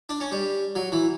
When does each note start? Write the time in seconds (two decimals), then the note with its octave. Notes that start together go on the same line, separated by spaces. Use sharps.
0.09 D4
0.20 C#4
0.32 G3
0.75 F#3
0.92 E3